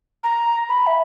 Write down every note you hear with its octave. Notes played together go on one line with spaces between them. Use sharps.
A#5
B5
E5